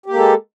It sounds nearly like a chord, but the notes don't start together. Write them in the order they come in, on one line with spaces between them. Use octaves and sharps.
G4 A#3 G#3 A4